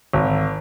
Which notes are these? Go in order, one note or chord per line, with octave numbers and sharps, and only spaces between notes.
G#1